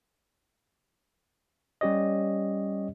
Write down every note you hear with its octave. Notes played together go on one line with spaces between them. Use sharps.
G3 C#4 G4 C#5 D#5